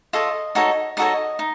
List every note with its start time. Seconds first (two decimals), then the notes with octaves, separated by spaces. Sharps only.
0.13 F4 A4 C#5 D#5
0.55 D#4 F#4 A4 C#5
0.97 D#4 F#4 A4 C#5 D#5
1.39 D#4